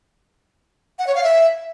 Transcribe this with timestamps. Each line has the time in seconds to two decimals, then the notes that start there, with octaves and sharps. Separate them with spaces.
0.99 F#5
1.07 C#5
1.15 F5
1.23 E5